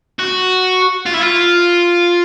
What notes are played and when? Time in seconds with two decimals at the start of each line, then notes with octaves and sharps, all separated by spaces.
0.19 F#4
1.06 F4
1.14 E4
1.22 F4